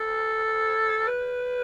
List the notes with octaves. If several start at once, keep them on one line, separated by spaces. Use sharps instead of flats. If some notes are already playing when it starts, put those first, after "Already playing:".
Already playing: A4
B4